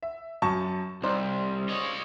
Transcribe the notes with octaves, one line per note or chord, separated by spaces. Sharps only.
E5
F#2 A5 C#6
C2 D#4 C5 D5
C#5 D#5